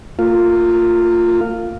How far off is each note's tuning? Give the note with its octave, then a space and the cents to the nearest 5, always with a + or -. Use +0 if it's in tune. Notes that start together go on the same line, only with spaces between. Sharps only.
A#3 -35 F4 +0